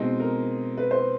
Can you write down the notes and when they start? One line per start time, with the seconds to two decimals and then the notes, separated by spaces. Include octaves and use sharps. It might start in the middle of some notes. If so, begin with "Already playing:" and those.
Already playing: B2 G#3 C4 D#4
0.20 A#4
0.77 B4
0.91 C5